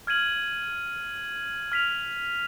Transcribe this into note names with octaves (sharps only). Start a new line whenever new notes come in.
F6 G#6 D#7 F#7
F6 B6 F7